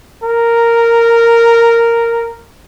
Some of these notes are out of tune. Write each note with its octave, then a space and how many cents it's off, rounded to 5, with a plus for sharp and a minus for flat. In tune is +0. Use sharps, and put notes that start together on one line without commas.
A#4 -5